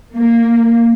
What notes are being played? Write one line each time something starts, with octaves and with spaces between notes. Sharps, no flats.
A#3